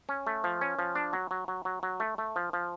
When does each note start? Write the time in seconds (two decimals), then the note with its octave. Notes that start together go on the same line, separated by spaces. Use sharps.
0.09 C#4
0.27 A3
0.44 F3
0.61 C#4
0.79 F3
0.95 D4
1.13 F#3
1.31 F#3
1.48 F#3
1.65 F#3
1.83 F#3
2.00 A3
2.18 A3
2.36 F3
2.53 F3